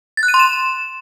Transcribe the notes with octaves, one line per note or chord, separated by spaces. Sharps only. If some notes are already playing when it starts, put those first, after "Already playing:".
A6
F#6
D#7
C6
E7